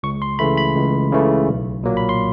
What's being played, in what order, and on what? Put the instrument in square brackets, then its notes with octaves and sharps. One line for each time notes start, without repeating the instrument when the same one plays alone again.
[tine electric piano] C#2 C#6
C6
C#3 E3 A3 B5
B5
C#2
C#3 E3 A3
B1
A#2 F#3 A#3
B5
C6